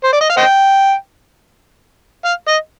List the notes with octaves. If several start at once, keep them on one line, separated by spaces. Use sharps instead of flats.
C5
D5
D#5
F5
C5 D#5 G5
F5
D#5